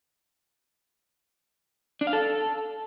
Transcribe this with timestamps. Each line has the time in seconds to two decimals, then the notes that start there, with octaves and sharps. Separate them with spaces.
2.01 D4
2.07 F5
2.13 A4